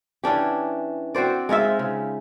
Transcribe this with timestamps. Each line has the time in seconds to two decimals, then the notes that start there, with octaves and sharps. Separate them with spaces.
0.24 E3 C#4 D4 G4
1.15 C4 F#4 C5 D5
1.49 G#3 D#4 F4 E5
1.79 C#3